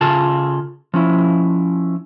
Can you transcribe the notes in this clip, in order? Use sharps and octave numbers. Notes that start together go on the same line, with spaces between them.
C#3 F4 G#4 A4 A5
F3 C#4 E4